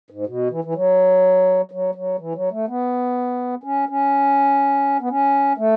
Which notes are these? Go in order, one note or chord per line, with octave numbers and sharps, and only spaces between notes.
G#2
B2
E3
E3
F#3
F#3
F#3
E3
F#3
A3
B3
C#4
C#4
B3
C#4
A3